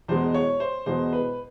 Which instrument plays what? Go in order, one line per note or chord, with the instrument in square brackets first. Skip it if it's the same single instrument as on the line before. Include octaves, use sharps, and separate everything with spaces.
[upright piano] E2 B2 G#3 C5
C#5
C5
E2 B2 G#3 C5
B4